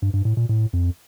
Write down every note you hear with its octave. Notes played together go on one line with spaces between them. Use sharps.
G2
G2
A2
A#2
A2
F2